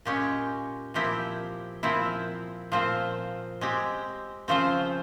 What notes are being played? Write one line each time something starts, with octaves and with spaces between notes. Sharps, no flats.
A#2 G#3 C#4 G4
A#2 F3 C4 E4 G4
A#2 F3 C4 E4
A#2 F3 C4 F4 C5
G#3 C4 G4
C#3 F3 C4 F4 C5